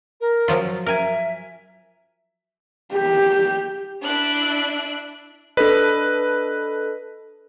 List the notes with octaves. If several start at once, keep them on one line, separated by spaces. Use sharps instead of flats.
A#4
F3 F#3 F4
A#4 E5 G#5
G4
D4 E4 E5 F#6 D7
D4 A4 B4 D#5